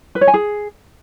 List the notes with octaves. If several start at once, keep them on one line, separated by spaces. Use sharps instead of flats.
B4
C#5
G#5
G#4